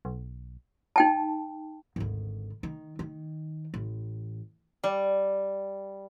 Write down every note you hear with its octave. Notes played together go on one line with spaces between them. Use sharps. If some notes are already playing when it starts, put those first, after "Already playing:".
B1
D#4 G5 A5
G#1 D2
D#3
D#3
A1
G3